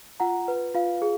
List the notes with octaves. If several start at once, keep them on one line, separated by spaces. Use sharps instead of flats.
F4 F#5 A#5
B4
F4 F5
G#4